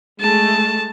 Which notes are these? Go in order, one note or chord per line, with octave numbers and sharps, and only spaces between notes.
G#3 A3 A5